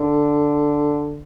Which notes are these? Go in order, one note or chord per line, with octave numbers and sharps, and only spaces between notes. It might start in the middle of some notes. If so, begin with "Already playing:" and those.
Already playing: D3